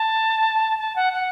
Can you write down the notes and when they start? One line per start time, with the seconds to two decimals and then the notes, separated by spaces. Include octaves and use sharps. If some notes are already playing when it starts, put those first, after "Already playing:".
Already playing: A5
0.79 A5
0.96 F#5
1.13 F#5